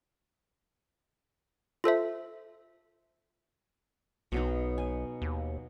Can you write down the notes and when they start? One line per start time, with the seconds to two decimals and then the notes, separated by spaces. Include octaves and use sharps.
1.84 F4 A4 C5 E5
4.32 B1 B2 F#3 D#4
4.78 G#5
5.22 D#2